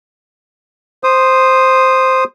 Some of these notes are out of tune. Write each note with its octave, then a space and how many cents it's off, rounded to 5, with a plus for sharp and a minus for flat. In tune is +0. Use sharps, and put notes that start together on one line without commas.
C5 +0 D#6 -10